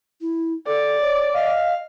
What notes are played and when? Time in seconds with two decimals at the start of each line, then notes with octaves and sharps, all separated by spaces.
0.21 E4
0.67 A4 D5
1.01 C#5
1.34 D#5 F5